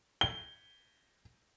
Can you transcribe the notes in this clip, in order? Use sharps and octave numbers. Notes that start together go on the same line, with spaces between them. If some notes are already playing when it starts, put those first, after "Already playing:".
G7